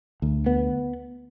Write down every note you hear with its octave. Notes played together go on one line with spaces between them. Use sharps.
D2
B3